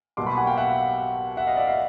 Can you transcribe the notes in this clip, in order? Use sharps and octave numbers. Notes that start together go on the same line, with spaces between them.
B1 B2 G3 A#3 C6 D6
B5 C#6
F#5 G#5
F5 G5
E5 F#5
E5 F#5
D#5 F5
D5 E5
D#5 F5